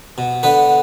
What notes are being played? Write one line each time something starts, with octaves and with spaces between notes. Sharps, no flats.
B2
D3 B3 B4